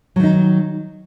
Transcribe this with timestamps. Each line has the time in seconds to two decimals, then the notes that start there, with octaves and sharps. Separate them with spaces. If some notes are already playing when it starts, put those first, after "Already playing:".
0.16 F#3
0.20 D#3
0.23 D#4